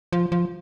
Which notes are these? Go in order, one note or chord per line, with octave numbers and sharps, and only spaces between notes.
F3
F3